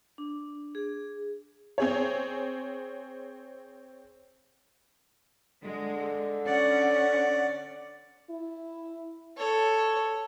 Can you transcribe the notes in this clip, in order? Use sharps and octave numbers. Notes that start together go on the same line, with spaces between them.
D4
G#4
C4 G#4 C#5
D3 G#3
C#4 D5 F#5
E4
A4 C#5